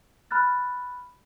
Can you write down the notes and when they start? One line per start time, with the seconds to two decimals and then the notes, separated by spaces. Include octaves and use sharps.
0.31 B5 F6 F#6 A6